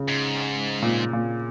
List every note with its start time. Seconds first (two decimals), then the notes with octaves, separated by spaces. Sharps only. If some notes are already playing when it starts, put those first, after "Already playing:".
Already playing: C#3
0.08 G#2
0.82 A#2
1.13 A#2